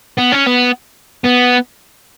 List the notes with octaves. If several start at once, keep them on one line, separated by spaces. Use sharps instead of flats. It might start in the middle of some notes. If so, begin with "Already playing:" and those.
B3
C#4
B3
B3